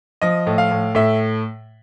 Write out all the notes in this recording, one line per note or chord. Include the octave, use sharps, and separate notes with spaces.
F3 D#5
A2
F5
A2
A2 E5